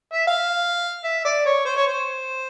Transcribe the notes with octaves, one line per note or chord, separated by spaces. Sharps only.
E5
F5
E5
D5
C#5
C5
C#5
C5